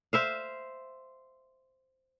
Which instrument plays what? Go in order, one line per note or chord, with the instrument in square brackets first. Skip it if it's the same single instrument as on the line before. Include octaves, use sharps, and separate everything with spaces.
[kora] C5 E5 F5